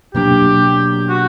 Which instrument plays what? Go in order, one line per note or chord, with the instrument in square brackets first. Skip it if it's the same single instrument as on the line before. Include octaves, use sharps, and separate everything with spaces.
[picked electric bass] B2 F#3 A#3 D4 [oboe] G4
[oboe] F#4